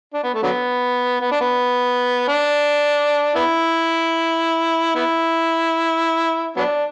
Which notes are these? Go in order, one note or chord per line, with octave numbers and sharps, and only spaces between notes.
D4
B3
A3
D3 F#3 B3
B3
D4
B3
D4
B3 E4
B3 E4
F#3 B3 D4